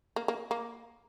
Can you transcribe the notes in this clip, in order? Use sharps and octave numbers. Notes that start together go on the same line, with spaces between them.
A#3
A#3
A#3